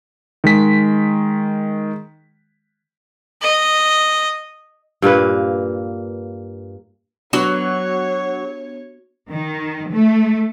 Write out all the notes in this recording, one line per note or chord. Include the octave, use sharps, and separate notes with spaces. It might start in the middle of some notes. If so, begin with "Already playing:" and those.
D#3 G#3 B6
D#5
G2 A#2 A#3 B4
F#3 B3 D4 F#4 C#5
D#3
A3